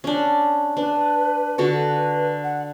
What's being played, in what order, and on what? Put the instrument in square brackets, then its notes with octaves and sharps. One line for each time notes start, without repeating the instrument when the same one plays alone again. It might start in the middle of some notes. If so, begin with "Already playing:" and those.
[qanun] C#4 D4
[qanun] D4 [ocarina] B4
[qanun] D3 F#4 A4 [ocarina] B4
[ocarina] F#5